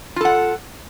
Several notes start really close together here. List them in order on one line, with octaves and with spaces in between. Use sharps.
F4 A4 F#5